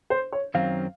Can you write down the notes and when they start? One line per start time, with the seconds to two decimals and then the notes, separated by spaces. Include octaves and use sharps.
0.10 C5
0.33 C#5
0.54 F#2 D#3 F#3 C4 F5